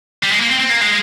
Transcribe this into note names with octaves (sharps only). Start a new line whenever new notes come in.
G3
G#3
A#3
C4
C4
A#3
G#3